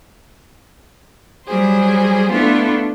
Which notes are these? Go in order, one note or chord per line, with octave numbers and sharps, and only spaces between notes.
F#3 G3 G#4 C5
A3 B3 D4 E4 F4 A4